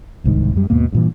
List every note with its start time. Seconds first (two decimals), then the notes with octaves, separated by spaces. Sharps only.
0.24 D1 C2 G#2 D#3
0.56 F#2 G3
0.70 D#2 G#2 B2 A#3
0.92 G2 A#2 E3